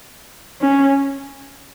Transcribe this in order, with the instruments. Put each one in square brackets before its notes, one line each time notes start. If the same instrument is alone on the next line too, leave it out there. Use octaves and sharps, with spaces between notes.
[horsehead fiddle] C#4